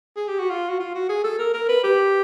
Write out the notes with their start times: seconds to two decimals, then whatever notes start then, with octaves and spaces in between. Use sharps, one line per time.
0.16 G#4
0.28 G4
0.39 F#4
0.50 F4
0.69 F#4
0.79 F4
0.94 F#4
1.09 G#4
1.24 A4
1.39 A#4
1.54 A#4
1.69 B4
1.83 G4